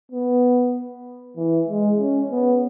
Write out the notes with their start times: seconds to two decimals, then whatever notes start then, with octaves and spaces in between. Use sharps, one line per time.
0.12 B3
1.37 E3
1.68 G#3
1.99 C#4
2.31 B3